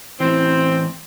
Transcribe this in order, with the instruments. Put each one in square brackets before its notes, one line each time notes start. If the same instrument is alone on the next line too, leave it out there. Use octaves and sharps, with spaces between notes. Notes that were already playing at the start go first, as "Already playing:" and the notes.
[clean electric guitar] A2 E3 [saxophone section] C4